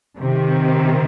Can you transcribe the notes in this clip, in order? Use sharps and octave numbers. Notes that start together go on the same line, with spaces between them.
C3 D#3